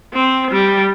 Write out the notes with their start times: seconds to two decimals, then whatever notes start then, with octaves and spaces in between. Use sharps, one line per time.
0.14 C4
0.52 G3